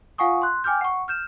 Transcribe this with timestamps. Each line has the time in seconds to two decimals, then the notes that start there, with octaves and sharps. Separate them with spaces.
0.18 F4 F5 F#5 G#5 C#6 D#6
0.42 C6 F#6
0.64 G5 G#5 D6 F6 G6
0.81 F#5 C#6
1.08 F6 G6 E7